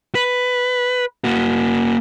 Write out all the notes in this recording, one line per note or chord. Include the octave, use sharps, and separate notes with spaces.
B4
A#3 F#4